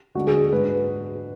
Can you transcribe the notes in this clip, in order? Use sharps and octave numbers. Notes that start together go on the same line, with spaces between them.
D2 D3 G#3 D4 F#4
G#4
G#2 G#3 D4 B4